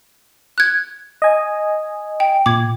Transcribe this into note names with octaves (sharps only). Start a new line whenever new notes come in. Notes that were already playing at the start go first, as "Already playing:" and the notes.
F#6 G#6
D#5 G#5
G5
A#2 D6 G#6